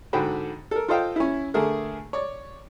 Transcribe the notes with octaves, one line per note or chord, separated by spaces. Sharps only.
G#2 D3 F#4 G5 B5
A4 A#4
F4 A4 C5 D#5 F5 G5
C#4 E4
D3 A3 G#4 A#4
C#5 D5